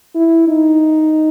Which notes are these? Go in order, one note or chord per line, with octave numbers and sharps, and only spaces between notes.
E4
D#4